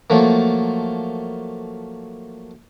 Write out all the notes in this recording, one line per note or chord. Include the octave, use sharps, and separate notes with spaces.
F3 F#3 A3 A#3